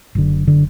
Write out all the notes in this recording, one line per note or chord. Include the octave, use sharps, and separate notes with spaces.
F#1 F#2 D3
D3